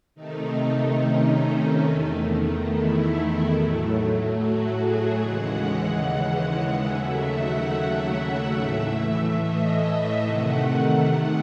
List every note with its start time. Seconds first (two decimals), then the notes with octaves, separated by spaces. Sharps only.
0.15 C3 D#3 A3 D#4
0.99 C#4
1.83 E2 D#3 A3
2.67 E4
3.51 A2 F#3 A3
4.35 F#4
4.77 G#4
5.19 D#2 C#3 E3 G#3 F#5
6.86 D#2 C#3 F#3 A3 E5
7.28 F#5
8.54 A2 E3 A3 E5
9.38 D#5
10.22 C3 D#3 A3 F#5
11.07 F#5